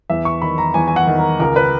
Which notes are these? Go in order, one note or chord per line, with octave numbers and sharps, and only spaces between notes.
E2 E5
C#6
D#3 B5
A#5
E2 G#5
G#5
F#5
D#3
A#4
C#2 A#4
B4